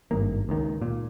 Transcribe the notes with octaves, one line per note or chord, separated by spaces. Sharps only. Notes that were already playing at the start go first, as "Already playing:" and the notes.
G#1 G2 A#3
C#2 D#3
A#2